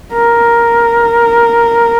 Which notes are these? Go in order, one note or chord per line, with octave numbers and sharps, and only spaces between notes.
A#4